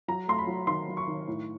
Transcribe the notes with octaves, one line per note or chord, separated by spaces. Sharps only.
F#3 A#5
A3 C6
B5
F#3
D#3 C6
F#3
C#6
D#3
A2